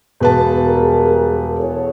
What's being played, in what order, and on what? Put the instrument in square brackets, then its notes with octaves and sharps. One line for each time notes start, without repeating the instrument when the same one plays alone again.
[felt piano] E1 B4 A5
[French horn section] G3 G#4 A#4
E2 A4 C#5